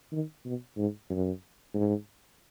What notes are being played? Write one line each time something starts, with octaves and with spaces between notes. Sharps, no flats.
D#3
B2
G#2
F#2
G#2